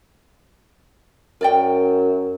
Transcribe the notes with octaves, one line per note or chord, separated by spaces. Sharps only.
F#2 A#4 D5 G5